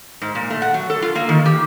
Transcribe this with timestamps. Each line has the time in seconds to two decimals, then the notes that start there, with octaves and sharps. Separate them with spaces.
0.22 G#2
0.35 A#2
0.50 A3
0.62 F#5
0.74 F#3
0.90 A4
1.02 F4
1.15 A#3
1.29 D#3
1.45 G4